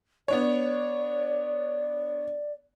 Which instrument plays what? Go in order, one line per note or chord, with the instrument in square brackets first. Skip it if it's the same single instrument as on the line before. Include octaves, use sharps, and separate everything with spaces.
[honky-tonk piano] B3 D4 C#5 [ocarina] D5